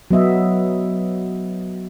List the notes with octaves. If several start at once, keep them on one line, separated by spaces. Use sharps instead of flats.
F#3 B3 D#5 E5